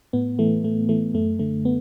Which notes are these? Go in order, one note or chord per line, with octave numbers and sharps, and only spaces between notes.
A2 B3
E3 A3
A2 A3
E3 A3
F#2 A3
D3 A3
B3